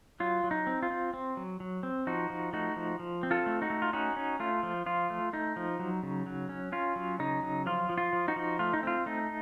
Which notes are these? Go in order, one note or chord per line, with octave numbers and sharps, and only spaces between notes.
F#3 F4
F#3
D#4
C4
F4
C4
C4
F#3
F#3
C4
F3 D#4 F#4
F3
A3 D#4 F#4
F3
F3
C4
F4 A4
A3
D#4 F#4
A3
F4
C#4 D#4 F#4
C#4
A3 F4
F3
F3 F4
A3
A3 D#4
F3
F#3
C#3
F#3
C#4
C#4 F4
F#3
C#3 D#4
F#3
F3 F4
F3
F4
F3
D#4 F#4
F3
A3 F4
D#4
C4 F4
A3 D#4